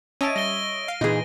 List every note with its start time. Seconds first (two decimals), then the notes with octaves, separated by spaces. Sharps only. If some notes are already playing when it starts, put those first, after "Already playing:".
0.21 C#4 C#5 D#5 E5 A5 A6 D7 D#7
0.36 G3 A#6 G7
0.88 F5
1.01 A#2 E3 D#4 F4 G#4 B4